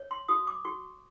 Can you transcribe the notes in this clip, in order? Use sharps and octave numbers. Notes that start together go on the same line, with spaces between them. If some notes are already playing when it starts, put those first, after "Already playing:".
Already playing: C#5
C6
F#4 D#6
D6
F#4 C#6